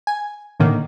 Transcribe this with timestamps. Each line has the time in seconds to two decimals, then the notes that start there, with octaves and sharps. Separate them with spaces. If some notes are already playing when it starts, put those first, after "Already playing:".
0.07 G#5
0.60 A2 D3 D#3 A#3